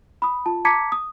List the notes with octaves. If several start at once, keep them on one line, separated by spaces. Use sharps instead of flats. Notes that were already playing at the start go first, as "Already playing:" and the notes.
B5 D#6
F4 A5
A5 A#5 D6 G#6 B6 C#7
D#6